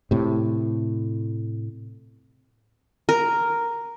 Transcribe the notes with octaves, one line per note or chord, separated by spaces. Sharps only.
A2 C3
A#4